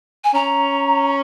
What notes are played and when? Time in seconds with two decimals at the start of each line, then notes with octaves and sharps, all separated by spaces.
0.24 G#5
0.34 C#4 A#5